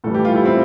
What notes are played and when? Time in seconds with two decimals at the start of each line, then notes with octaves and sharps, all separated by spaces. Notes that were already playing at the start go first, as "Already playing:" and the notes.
0.04 A2 E3 G3 A4
0.14 G4
0.25 F4
0.35 E4
0.45 C4